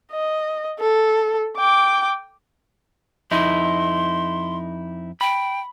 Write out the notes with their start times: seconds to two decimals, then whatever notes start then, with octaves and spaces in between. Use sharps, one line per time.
0.12 D#5
0.80 A4
1.58 G5 D6
3.31 F2 D#4 E4 C6
5.21 G5 B5